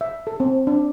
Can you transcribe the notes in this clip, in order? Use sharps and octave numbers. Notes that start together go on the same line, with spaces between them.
E5
A4
C4
D4